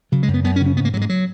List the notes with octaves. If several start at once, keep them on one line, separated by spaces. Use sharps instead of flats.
C#3 F#3
G#3
F#2
B3
F#2 B3
C#4
C#3
C#4
G#2 B3
A#3
G#2 F#3
G#3
F#3